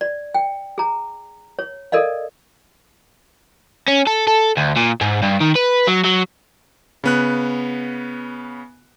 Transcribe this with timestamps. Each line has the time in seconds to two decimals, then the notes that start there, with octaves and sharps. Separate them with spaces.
0.01 D5
0.34 G5
0.78 G#4 A#5
1.59 C#5
1.92 A4 A#4 D5 D#5 F5
3.88 C#4
4.07 A4
4.27 A4
4.57 D2
4.77 A#2
5.01 G#2
5.22 G2
5.40 D#3
5.55 B4
5.87 F#3
6.04 F#3
7.04 C#3 B3 F#6